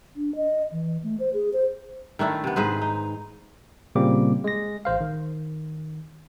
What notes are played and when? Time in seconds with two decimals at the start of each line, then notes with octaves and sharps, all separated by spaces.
0.16 D4
0.36 D#5
0.72 E3
1.03 A3
1.20 C5
1.34 G#4
1.53 C5
2.19 D#3 A3 D4 E4
2.44 C3 B3
2.56 G#2 G#4 B4 C5
2.82 D#4
3.95 A#2 C#3 G3 A#3 C4 D6
4.44 G#3 A#6
4.85 A1 C5 F5
5.01 D#3